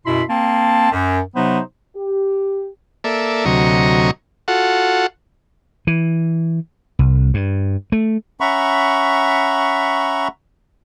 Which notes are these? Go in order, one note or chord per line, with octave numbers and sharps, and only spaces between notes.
F#2 B2 E4 B5 C6
A#3 C4 A5
F#2
C3 F#3 B3 D#4 C5
G4
A#3 A4 D5 E5
D2 C3 F#3 D#5 A#5 C#6
F4 F#4 A4 F#5
E3
C2
G2
A3
C#4 E5 F#5 A#5 B5 C#6